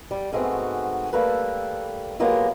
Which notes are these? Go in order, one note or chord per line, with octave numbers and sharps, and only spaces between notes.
G3
G#2 G#3 A3 B3 C4 F#4
G3 A3 A#3 A4 B4
F#3 G#3 A#3 B3 F4 G4